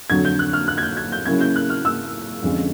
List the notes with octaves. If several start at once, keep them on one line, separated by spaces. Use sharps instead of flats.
F2 D3 F#3 G#6
G6
F#6
F6
F#6
G#6
G6
G#6
G6
C#3 F#3 A#3 C#4 E4 G#6
G6
F#6
F6
E6
F2 D3 F3 G#3 C#4